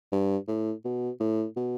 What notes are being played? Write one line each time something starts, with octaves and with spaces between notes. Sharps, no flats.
G2
A2
B2
A2
B2